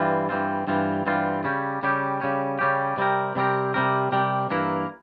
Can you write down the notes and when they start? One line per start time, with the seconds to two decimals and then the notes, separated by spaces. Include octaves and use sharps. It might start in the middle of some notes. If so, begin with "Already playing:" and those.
Already playing: G2 E3 G3 C4 F4
0.29 G2 E3 G3 C4 F4
0.67 G2 E3 G3 C4 F4
1.06 G2 E3 G3 C4 F4
1.44 C#3 G3 C#4 G4
1.83 C#3 G3 C#4 G4
2.21 C#3 G3 C#4 G4
2.59 C#3 G3 C#4 G4
2.97 C3 G3 C4 G4 A#4
3.35 C3 G3 C4 G4 A#4
3.74 C3 G3 C4 G4 A#4
4.12 C3 G3 C4 G4 A#4
4.50 G2 E3 A#3 E4 A#4